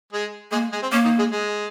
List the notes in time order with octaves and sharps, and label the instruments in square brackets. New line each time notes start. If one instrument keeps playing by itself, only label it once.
[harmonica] G#3 G#4
[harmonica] G#3 G#4 [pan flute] A#3
[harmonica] G#3 G#4
C4
[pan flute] A#3 [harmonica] C#4
[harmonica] D#3 D#4
G#3 G#4
G#3 G#4